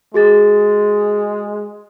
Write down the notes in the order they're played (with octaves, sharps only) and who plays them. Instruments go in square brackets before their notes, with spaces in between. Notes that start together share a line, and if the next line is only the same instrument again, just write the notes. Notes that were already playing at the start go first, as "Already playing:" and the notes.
[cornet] G#3 [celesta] F#4 G#4 A6